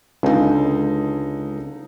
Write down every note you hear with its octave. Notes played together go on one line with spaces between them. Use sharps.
C#2 D3 D#4